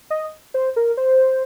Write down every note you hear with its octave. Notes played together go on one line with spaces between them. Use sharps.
D#5
C5
A#4
C5